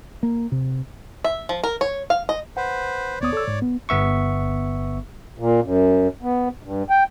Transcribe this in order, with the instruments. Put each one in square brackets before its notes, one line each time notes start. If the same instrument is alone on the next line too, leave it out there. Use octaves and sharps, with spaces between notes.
[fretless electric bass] A#3
C3
[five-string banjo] E5
F3
A#4
C#5
F5
D#5
[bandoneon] B4 C5 [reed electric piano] F#5
[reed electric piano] D#2 B3 D#6 [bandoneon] C#5 D5
[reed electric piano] A4 E6
G#2
B3
[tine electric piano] G1 B3 E5 C#6
[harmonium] A#2
F#2
B3
G2
G5